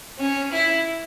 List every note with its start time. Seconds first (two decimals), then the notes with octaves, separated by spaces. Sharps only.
0.18 C#4
0.51 E4